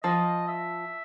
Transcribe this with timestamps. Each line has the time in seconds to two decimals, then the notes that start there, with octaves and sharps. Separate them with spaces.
0.03 F3 D#5
0.48 E5